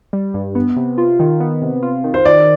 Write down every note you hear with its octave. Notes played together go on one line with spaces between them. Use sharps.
G3
G2
B3
C3
F4
D#3
B3
C3
F4
D#3
C5
D#3 D5